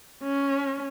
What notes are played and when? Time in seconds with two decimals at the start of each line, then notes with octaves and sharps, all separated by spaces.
0.23 C#4